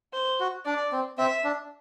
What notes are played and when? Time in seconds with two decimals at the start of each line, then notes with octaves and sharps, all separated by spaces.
0.13 C5
0.40 F#4
0.66 D4 D5
0.92 C4
1.18 C4 E5
1.44 D4